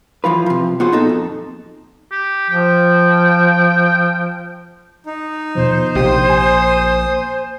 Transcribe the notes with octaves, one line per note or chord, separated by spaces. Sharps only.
E3 F3 F4 B4
C3 F3
B3 F4 F#4 G#4 C5
A#2 D#4 A4
F2
G4
F3 G5
D#4
D#2 B2 F3 C5
A#1 C3 D#4 G4 C6 D#6
G#5